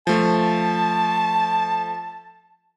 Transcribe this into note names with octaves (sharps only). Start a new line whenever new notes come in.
F3 A3 A5